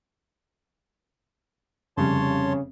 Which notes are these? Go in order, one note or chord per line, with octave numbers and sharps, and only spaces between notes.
F1 C#3 G3 C#5 A5 C6